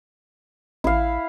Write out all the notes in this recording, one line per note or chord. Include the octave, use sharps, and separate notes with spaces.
A1 E4 F5